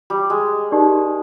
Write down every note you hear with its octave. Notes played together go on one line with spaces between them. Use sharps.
G3
G#3
D#4 G4 A#4 D5